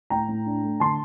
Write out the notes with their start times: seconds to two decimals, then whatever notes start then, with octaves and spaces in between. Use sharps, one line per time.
0.10 A2 G5 A#5
0.28 A2
0.46 D4
0.63 A3
0.80 D3 A5 C6